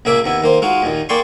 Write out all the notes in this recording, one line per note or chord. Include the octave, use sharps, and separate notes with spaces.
C#2 A#2 A#3 G#4 E5 D6
D#2 B3 E4
D#3 A#3 C5
G#3 D#4 F4 F#4
D#2 A#2 D#3
A#3 G#4 D5 G5 C6 C#6